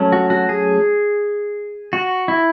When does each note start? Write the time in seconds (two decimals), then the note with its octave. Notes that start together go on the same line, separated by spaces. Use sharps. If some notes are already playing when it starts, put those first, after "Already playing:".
Already playing: F#3 A3 C#4
0.12 F#4
0.30 F#4
0.49 G#4
1.93 F#4
2.28 E4